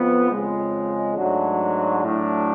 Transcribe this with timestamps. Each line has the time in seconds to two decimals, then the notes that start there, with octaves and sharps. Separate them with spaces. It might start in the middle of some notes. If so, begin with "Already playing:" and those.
Already playing: F2 F3 B3
0.31 F2 C#3 G#3
1.17 G#2 F#3 A3 D4 F#4
2.03 A2 F#3 A3 D4